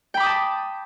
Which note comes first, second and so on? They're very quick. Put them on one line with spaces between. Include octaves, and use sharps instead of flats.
G5 B5 D6 D#6 A5